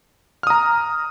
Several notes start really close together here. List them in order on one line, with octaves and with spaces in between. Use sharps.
F6 D#6 A#5